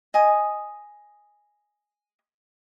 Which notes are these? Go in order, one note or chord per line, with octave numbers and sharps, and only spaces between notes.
D#5 G#5 D#6